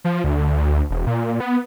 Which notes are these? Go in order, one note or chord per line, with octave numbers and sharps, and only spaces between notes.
F3
D2
D2
D2
E1
A#2
B3